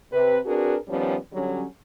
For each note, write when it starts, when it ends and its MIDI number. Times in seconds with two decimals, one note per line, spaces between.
0.12 0.38 48
0.12 0.38 71
0.45 0.76 60
0.45 0.76 62
0.45 0.76 66
0.45 0.76 68
0.45 0.76 70
0.45 0.76 71
0.88 1.15 51
0.88 1.15 53
0.88 1.15 55
0.88 1.15 59
0.88 1.15 61
1.33 1.64 50
1.33 1.64 54
1.33 1.64 55
1.33 1.64 61